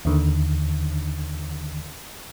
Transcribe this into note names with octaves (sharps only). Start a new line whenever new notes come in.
D#2 D3 D#3